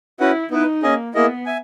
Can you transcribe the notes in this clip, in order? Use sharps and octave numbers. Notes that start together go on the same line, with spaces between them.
C#4 E4 F#4 B4 F#5
B3 D#4 E4 B4
A#3 C#4 G#4 D#5 G#5
A#3 B3 E4 G#4 D#5
E5 G#5